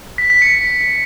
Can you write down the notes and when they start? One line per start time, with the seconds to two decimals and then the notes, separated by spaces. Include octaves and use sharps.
0.18 B6
0.30 B6
0.42 C#7